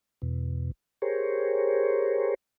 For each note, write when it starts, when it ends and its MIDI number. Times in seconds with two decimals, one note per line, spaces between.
0.22 0.71 40
0.22 0.71 47
1.02 2.34 67
1.02 2.34 68
1.02 2.34 70
1.02 2.34 72
1.02 2.34 73